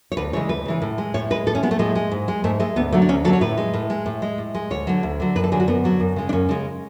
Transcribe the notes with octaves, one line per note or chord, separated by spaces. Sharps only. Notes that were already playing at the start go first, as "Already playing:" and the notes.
C#5
D2 B4
C#3 E3 G#3 C#5
D2 B4
C#3 E3 G#3
A2
G#3
A2 C#5
G#3 B4
A2 A4
C#4
G#3 B3
A3
A2 G#3
G#3
G#2
G#3
G#2 A3
G#3 A3
D2 B3
D3 F#3 A3
D4
D2 C#4
D3 F#3 A4
C#5
A2 B4
G#3
A2
G#3
A2
G#3
A2
G#3
D2 C#5
D3 F#3
D2
D3 F#3
F#2 B4
A4
D3 F#3 G#4
F#4
F#2 B3
D3 F#3
F#2
C#3 G#3
D4
F#2 C#4
C#3 G#3